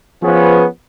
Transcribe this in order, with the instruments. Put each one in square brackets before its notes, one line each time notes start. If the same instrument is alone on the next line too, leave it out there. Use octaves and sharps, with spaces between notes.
[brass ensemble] F3 B3 C#4 G#4 B4